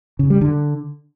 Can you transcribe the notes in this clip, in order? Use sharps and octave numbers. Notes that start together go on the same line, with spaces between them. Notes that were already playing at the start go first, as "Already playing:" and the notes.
C#3
G3
D3